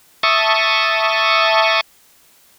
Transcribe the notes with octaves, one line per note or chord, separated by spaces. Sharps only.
E5 A5 C#6 D#6